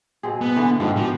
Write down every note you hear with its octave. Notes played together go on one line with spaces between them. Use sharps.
B2 C4 G#4
B3
D3 E3
G#2 D#3 F3 G3
F3 B3 F#4 G4